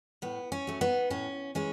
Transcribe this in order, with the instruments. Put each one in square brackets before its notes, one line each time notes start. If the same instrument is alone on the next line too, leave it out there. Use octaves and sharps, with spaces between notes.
[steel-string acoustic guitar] A2 B3
C#4
F#3 A3
B3 D#4
A2 C#4
E3 G#3 C#4